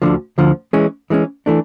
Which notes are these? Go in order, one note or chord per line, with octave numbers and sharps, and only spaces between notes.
D2 D3 F3
D2 D3 F3
E3 G#3 C#4
E3 G#3 C#4
E3 A3 D4